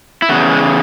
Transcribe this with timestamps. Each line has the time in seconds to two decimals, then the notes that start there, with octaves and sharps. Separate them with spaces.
0.22 E4
0.29 E2 C#3 F#4
0.51 G#3